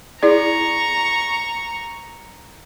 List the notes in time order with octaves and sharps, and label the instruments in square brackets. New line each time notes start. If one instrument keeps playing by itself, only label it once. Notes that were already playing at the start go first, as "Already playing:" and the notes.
[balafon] E4 G#4 D5 [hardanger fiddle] A#5 C#6